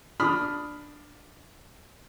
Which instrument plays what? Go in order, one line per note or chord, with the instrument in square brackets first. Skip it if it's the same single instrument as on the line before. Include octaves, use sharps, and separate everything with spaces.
[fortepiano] D4 B5 D#6 F6